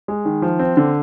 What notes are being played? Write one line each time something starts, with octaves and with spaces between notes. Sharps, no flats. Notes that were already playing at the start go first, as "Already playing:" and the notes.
G#3
D#3
F3
C4
D3